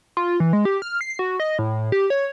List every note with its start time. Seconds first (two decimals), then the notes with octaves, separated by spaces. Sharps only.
0.17 F4
0.40 E3
0.53 G#3
0.65 G4
0.82 F6
1.01 C7
1.19 F#4
1.40 D#5
1.59 A2
1.92 G4
2.10 C#5